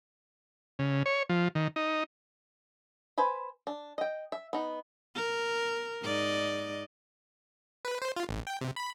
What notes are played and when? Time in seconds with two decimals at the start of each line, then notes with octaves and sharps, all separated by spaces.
0.79 C#3
1.06 C#5
1.29 F3
1.55 D#3
1.76 D#4
3.18 B4 C5 G#5 B5
3.67 D4
3.98 D#5 G5
4.32 E5
4.53 B3 D#4
5.15 A#4
6.03 G#2 D5 D#5
7.85 B4
8.02 C5
8.17 F4
8.29 A1
8.47 G5
8.61 C3
8.76 B5